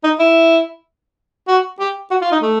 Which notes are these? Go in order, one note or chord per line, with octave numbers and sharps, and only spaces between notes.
D#4
E4
F#4
G4
F#4
F4
D#4
A3